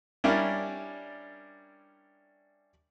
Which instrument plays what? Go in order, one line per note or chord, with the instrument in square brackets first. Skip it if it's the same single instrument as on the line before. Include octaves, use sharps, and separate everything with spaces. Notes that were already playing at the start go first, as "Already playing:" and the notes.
[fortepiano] G3 C#4 D4 E4 A#4 D5